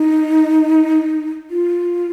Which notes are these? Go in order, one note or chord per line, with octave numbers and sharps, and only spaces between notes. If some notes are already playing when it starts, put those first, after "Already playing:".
Already playing: D#4
F4